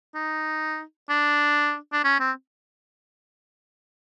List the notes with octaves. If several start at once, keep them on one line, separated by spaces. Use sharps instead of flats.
D#4
D4
D4
C#4
C4